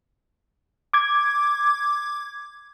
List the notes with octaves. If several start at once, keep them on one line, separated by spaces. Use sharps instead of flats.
D6 G#6